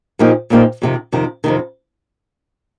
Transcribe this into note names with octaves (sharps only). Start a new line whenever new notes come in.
A#2 F3 A#3 D#4 G4
A#2 F3 A#3 D#4 G4
F2 C3 D#3
F2 C3 D#3
F2 C3 D#3